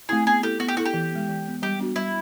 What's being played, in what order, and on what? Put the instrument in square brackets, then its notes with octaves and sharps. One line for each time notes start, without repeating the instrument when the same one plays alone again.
[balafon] A3 C4 E4 [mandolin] G#4
[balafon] B3 [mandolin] G#4
[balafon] E4 A4 [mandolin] G4
[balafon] B3 [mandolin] F#4
[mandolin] G4
[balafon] E4 A4 [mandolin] F#4
[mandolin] G4
[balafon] E3
G#3 B3
E3
G#3 B3
[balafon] G3 [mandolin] G4
[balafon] B3 D4 F#4
[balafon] G3 [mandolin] E4